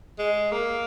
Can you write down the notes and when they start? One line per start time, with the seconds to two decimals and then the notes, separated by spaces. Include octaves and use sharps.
0.19 G#3
0.52 A#3